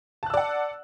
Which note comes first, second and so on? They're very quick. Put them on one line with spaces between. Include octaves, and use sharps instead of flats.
A5 F#6 E6 D5 F#5